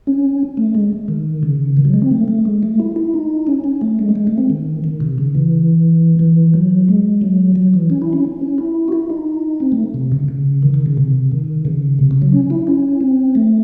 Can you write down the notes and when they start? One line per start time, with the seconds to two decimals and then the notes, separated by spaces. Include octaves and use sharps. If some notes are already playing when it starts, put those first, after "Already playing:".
0.07 C#4
0.57 A3
0.75 G#3
1.08 D#3
1.43 C#3
1.77 D#3
1.85 F#3
1.94 G#3
2.02 C4
2.11 A3
2.28 A3
2.45 G#3
2.63 A3
2.80 E4
2.96 E4
3.14 D#4
3.47 C#4
3.64 C#4
3.81 A3
3.99 G#3
4.09 A3
4.15 G#3
4.27 A3
4.38 C4
4.50 D#3
4.84 D#3
5.00 C3
5.18 C#3
5.35 E3
6.19 E3
6.54 F#3
6.88 G#3
7.21 F#3
7.56 F#3
7.74 E3
7.90 C#4
8.02 E4
8.13 C#4
8.41 C#4
8.58 E4
8.88 F#4
8.92 E4
9.10 D#4
9.60 C4
9.72 A3
9.94 C3
10.12 C#3
10.29 C#3
10.62 D#3
10.74 D#3
10.86 C#3
10.97 C3
11.31 D#3
11.65 C#3
11.99 C3
12.11 C#3
12.22 F#3
12.32 C#4
12.50 E4
12.67 C#4
13.01 C4
13.35 A3